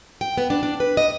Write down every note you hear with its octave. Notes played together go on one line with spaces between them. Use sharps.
G5
B3
D4
D4
B4
D#5